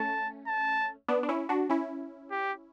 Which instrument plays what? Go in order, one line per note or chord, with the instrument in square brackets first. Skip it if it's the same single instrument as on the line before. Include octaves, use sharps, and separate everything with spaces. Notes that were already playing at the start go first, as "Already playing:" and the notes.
Already playing: [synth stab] A3 C#4 [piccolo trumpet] A5
[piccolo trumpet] A5
[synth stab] B3 D4
D4
C#4 E4
D4 F#4
C#4 E4
[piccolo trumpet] G4